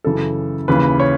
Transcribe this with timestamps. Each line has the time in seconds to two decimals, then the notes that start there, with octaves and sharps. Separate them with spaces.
0.04 F#2 C#3 E3 A4
0.68 D#2 C#3 E3 B4
1.00 C#5